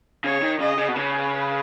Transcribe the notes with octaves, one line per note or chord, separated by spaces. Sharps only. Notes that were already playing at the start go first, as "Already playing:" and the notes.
C#3 C#5
D#3
C#3 D#5
C#3
B2
C#3 B4